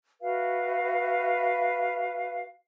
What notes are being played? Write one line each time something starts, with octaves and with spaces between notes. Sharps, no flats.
F#4 B4 E5 F5